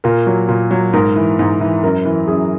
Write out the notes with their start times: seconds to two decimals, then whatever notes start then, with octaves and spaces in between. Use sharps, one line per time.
0.04 A#2 A#4
0.27 F#3
0.49 A#2
0.71 F#3
0.93 G#2 A#4
1.16 E3
1.39 G#2
1.61 E3
1.83 F#2 A#4
2.05 E3
2.27 F#2 G#4